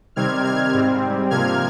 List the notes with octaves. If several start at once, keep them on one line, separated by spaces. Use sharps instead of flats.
C3 D#3 G3 C4 F6 G#6
F6 G#6
G#2 G3 C4
C3 F3 A#3 F6 G#6